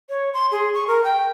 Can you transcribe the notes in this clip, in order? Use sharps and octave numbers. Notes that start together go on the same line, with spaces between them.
C#5
C6
G#4
C#6
A#4
G5